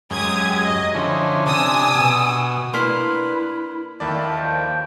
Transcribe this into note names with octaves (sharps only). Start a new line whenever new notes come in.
F#2 G#3 G4 D#6 G#6
D#5
D3 F3 C#4 E4
C3 D4 G#5 D#6 E6
B2
A#3 D4 E4 B4 C6 F6 B6
D#2 D#3 E4 A4 D5 A5 B5
F3 G5